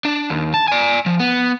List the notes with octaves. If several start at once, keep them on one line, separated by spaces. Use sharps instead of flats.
D4
D#2
A5
D5 G#5
F3
B3